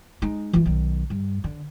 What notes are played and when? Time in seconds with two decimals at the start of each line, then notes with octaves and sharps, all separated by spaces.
0.22 G#3 D#4
0.53 E3 F4
0.65 B1 D#3
1.10 G2
1.44 D3